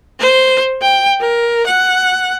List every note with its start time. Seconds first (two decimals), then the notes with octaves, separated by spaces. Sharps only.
0.20 C5
0.82 G5
1.20 A#4
1.66 F#5